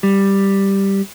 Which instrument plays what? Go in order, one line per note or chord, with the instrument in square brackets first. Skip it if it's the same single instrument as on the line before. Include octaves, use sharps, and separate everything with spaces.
[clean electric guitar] G3